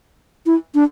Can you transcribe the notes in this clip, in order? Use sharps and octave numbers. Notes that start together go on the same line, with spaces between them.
E4
D4